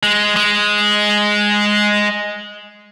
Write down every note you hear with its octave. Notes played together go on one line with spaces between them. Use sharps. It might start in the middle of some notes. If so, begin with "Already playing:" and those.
G#3
G#3